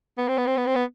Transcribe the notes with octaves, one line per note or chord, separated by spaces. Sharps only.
B3
C4
B3
C4
B3
C4
B3